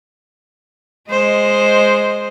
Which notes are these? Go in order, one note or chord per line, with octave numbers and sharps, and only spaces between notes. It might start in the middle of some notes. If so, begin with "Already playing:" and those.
G#3 C5 D#5